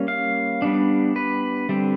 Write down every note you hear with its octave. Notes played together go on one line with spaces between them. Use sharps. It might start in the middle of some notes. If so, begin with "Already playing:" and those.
Already playing: G3 A#3 C#4
F5
G3 B3 D4
B4
D3 G3 C4